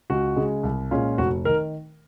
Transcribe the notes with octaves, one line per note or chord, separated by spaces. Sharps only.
C#2 F#4
C#3 G#3
C2
A#2 G#3 C#4 F4
F1 F#4
D#3 A#4